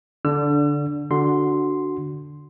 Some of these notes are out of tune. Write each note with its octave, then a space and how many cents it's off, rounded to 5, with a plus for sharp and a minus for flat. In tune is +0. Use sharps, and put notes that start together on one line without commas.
D3 -15 D4 +0 E6 +45
D3 +0 F#4 +0 C6 -5